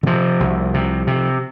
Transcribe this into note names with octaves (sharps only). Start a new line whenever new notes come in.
D3
C3 F3
C2
C3
C3